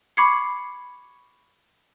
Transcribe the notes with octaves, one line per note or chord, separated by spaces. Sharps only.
B5 C#6 D6 G#6 C7 C#7